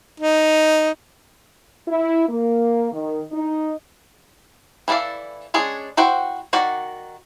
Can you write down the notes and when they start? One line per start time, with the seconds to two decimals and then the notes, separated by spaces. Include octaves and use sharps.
0.20 D#4
1.87 E4
2.28 A#3
2.92 D#3
3.32 D#4
4.88 E3 E4 A4 D5 F5
5.54 G#3 C#4 D4 G#4
5.97 E4 F#4 C5 G5
6.53 D#3 F#4 A#4 D5